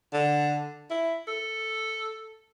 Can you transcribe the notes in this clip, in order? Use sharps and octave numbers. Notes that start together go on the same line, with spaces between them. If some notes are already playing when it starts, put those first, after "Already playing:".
D3
E4
A4